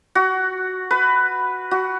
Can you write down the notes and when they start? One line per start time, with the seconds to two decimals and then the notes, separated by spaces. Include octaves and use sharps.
0.15 F#4
0.91 B4
1.71 F#4